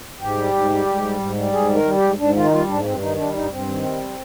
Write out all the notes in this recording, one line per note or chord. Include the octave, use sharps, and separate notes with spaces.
G#2 G4
G3
G#2
G3
G#2
G3
G#2
G3
G#2 G#4
D#3
A#4
G3
G4
G#2
G#2 D4
D#3 F4
D#4
G3 F4
G#2 D4
A#3
G2 C4
D#3 D#4
G3 D4
G2 D#4
G2 C4
D#3
G3